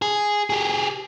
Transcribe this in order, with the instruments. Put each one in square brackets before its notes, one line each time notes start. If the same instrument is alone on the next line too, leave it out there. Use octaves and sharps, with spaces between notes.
[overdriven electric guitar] G#4
G4 G#4